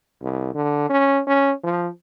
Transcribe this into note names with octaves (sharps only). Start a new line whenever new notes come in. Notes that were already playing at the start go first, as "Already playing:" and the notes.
C2
D3
C#4
C#4
F3